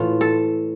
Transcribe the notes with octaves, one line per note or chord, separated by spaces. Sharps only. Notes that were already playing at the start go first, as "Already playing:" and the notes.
Already playing: A2 E3 A3 F4
A4